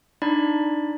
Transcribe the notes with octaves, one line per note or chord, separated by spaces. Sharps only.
D4 D#4 D5 B5